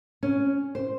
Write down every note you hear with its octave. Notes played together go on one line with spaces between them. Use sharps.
C#4
C5